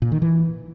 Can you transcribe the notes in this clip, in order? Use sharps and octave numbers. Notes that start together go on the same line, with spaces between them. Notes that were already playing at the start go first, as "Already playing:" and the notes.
A#2
D#3
E3